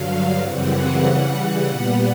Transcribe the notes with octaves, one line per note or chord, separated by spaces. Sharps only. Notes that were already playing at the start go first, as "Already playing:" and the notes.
Already playing: G2 D3 F#3 F5
F#2 C#3 E3 G3 C4 F#5
C#3 E3 G3
A#2 G3 B3 F#5